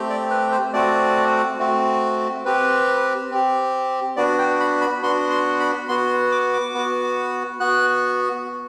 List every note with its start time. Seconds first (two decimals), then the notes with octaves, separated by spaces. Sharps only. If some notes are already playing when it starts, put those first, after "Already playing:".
Already playing: A3 C4 G4
0.10 D5
0.30 B4
0.52 C5
0.73 A3 C4 F#4 D5
1.59 A3 C4 F#4
2.45 C4 G4 B4
3.31 C4 G4
4.16 B3 D4 F#4 D5
4.38 G5
4.60 B5
4.81 B5
5.02 B3 D4 F#4 C6
5.31 C6
5.60 B5
5.89 B3 F#4 C6
6.32 D6
6.53 D6
6.74 B3 F#4
7.60 B3 F#4 F#6